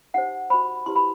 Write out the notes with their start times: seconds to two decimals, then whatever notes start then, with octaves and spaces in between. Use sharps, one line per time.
0.14 D#4 G4 C5 F#5
0.50 F#4 C5 B5
0.86 E4 G4 B4 C6
0.96 B5